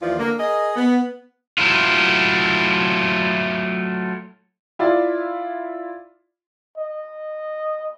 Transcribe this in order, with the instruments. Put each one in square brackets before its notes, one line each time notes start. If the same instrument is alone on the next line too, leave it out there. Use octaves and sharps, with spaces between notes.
[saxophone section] D#2 E3 F3 F4 D5
D3 A#3
G#4 A#4 D#5
B3
[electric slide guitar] F#3 A3 E4 F4
[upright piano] E4 F4 D5
[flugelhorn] D#5